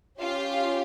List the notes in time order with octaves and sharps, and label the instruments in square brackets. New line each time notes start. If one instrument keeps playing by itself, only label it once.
[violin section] C#4 F4 G4 F5